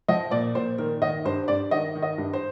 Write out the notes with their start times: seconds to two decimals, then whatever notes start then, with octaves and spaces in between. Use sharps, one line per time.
0.08 F3 D#5
0.31 A#2 D5
0.55 A#2 C5
0.78 D#3 A#4
1.02 D#3 D#5
1.25 G2 C5
1.48 G2 D5
1.71 D#3 D#5
1.95 D#3
2.02 D#5
2.18 G2
2.33 C5